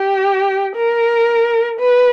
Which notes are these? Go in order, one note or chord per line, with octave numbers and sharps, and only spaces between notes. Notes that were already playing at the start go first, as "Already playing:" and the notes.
Already playing: G4
A#4
B4